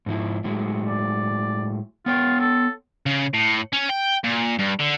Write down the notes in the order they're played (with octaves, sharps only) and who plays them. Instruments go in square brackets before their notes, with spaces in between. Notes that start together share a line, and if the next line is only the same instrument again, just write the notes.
[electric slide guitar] G#2 F3 E4
A2 F#3 G#3
[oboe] D5
[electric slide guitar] B3 C#5 G5 [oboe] F4
[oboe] A4
[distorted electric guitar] C#3
A2
C#4
G5
A#2
G2
D3